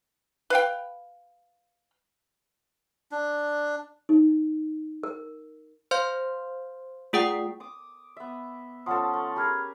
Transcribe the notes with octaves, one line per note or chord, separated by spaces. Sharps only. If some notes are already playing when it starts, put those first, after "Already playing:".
B4 F5 G5
D4
D#4
A#4
C5 F5 C6 G6
A3 F4 G#4 F#5 G5 D#6
D6 D#6
B3 E5
F3 C#4 A4 F#5 C6 D#6
A3
G4 G#4 A#4 B5 F6 G#6